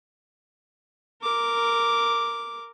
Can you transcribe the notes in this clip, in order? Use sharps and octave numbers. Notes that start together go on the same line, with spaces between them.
A#4 D6